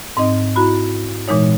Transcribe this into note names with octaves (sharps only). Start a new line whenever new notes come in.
G#2 C4 D#4 D#5
E4 F#4 A#5 B5
A#2 E3 G#3 D#4 C#5